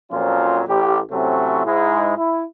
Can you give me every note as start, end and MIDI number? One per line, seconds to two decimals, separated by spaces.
0.12 0.62 41
0.12 0.62 46
0.12 0.62 53
0.12 0.62 54
0.12 0.62 61
0.12 0.62 65
0.68 0.99 33
0.68 0.99 67
1.12 1.65 45
1.12 1.65 48
1.12 1.65 54
1.12 1.65 57
1.12 1.65 60
1.12 1.65 61
1.66 2.16 44
1.66 2.16 56
1.66 2.16 64
2.18 2.44 64